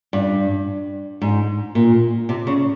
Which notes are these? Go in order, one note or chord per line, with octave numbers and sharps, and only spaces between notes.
G2
G#2
A#2
C3
C#3